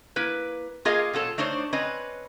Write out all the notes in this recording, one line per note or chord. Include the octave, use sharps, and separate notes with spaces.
A#3 E4 B4
A#3 F4 G#4 A#4 D#5 F5
B2 F4 A4 C#5
A3 D4 D#4 C5 C#5
C4 C#4 B4 D#5